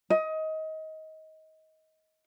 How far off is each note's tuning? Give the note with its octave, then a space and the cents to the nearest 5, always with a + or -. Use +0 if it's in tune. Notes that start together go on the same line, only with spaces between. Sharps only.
D#5 +25